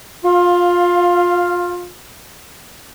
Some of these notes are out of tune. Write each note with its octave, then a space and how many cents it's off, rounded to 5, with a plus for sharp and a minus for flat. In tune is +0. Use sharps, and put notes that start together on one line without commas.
F4 +20 F5 +0